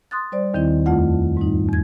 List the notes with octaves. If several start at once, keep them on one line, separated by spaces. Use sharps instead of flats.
C6 D#6 F#6 A6
G3 C5 D5
D#2 D#3 C4 E4
F2 A3 F4 F#5
G#2 G3 D#4
E2 G#6